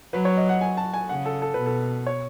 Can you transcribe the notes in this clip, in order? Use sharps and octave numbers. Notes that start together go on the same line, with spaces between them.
F#3 B4
C#5
D#5
F#5
G#5
A5
G#5
C#3 F#5
A4
A4
B2 B4
A4
C#5